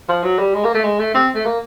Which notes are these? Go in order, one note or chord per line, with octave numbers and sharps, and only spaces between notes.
F3
F#3
G3
G#3
A#3
A3
G#3
A3
C4
A3
A#3